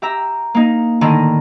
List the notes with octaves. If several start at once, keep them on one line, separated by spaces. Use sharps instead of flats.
G4 E5 A#5
A#3 D#4
A2 D3 D#3 D#4